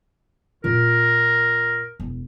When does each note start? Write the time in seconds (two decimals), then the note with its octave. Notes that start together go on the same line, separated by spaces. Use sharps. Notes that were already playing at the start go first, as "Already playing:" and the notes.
0.64 A#2 F4 A#4
2.00 E1